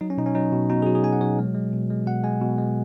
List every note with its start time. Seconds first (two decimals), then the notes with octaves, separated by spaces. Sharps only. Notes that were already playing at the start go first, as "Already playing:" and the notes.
0.01 F#3 D#4
0.10 C#4
0.18 B2 D#4
0.26 C#4
0.35 F#3 D#4
0.53 B2
0.70 B2 D#4
0.82 G#4
0.86 F#3 F#4
0.95 G#4
1.03 B2 G#5
1.13 F#5
1.21 F#3 C#5
1.39 G#3
1.55 G#3
1.73 B2
1.90 G#3
2.06 B2 F#5
2.23 G#3 G#5
2.41 B2
2.58 G#3